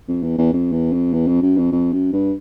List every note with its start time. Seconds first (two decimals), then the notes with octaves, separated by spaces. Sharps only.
0.08 F2
0.23 E2
0.38 E2
0.53 F2
0.72 E2
0.92 F2
1.13 E2
1.27 F2
1.42 F#2
1.57 F2
1.72 F2
1.92 F#2
2.12 G2